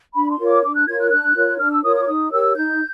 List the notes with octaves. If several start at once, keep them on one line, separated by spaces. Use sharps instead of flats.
D4 B5
C6
F4 A#4 C#5
D6
D4 D6
F#6
F4 A#4 C#5 G#6
F#6
D4 F#6
F4 A#4 C#5
D4 F6
E6
F4 A#4 C#5 D#6
D#6
D6
D#4 D#6
G4 A#4 C#5 E6
D#4 G6